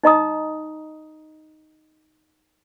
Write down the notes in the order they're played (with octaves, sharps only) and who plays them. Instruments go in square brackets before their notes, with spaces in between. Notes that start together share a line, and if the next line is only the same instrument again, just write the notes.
[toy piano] D#4 D#5 A#5 D#6